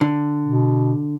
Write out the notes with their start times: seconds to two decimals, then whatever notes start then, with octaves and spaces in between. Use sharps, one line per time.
0.01 D3
0.46 B2